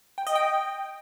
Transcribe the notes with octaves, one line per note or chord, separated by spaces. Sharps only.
G5
D#5
G5